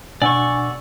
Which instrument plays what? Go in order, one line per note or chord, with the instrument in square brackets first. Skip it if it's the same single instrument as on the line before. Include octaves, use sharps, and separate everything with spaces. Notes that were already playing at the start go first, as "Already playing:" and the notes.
[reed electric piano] B2 D4 F#5 [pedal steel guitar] D5 C#6 [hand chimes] G#5 E6